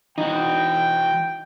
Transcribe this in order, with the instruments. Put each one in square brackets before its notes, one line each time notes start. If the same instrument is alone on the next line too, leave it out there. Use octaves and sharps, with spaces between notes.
[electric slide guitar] E3 F#4 [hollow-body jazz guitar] D#4 [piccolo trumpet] G5